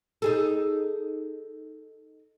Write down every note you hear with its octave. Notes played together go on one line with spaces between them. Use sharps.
D#4 G#4 A4